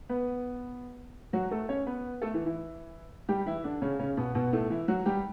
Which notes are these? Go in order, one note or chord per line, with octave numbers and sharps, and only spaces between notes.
B3 B4
F#3 F#4
A3 A4
C#4 C#5
B3 B4
A3 A4
E3 E4
E3 E4
G3 G4
E3 E4
D3 D4
C#3 C#4
C#3 C#4
B2 B3
B2 B3
A2 A3
E3 E4
F#3 F#4
G3 G4